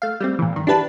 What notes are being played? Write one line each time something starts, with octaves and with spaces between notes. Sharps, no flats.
A3 F5
G3 A3 C4
A#2 E3
G2 D#3
D4 E4 G4 B4 A5